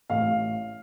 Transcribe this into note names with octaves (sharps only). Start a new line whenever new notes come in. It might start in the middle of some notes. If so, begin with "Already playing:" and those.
A1 F5